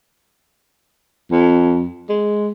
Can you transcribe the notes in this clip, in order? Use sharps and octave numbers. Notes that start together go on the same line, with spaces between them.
F2
G#3